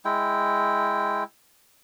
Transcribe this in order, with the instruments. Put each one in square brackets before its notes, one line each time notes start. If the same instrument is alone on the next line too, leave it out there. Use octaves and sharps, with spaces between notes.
[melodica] G#3 E4 G5